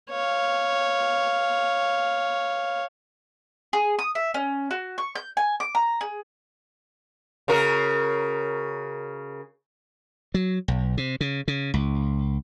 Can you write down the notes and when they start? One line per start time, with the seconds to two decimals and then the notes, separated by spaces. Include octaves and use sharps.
0.10 C#5 F5
3.73 G#4
3.99 D#6
4.15 E5
4.34 C#4
4.71 F#4
4.98 C#6
5.15 G6
5.37 G#5
5.60 D6
5.75 A#5
6.01 G#4
7.48 C#3 F#4 A#4
10.34 F#3
10.68 B1
10.97 C3
11.21 C#3
11.48 C#3
11.74 C#2